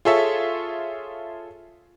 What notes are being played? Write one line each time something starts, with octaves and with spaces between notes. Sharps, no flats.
F4 G#4 A4 C#5 E5